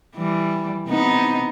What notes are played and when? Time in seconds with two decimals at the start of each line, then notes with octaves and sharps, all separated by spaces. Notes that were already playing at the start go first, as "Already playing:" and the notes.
0.16 E3 G3
0.87 C3 B3 D#4